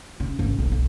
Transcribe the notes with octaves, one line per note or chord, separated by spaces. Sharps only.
D#2 C#3
G#1 C#3
B1 C3
B1